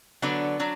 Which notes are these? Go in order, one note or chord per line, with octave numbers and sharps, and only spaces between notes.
D3 F#3 B3 D4
F#3 D4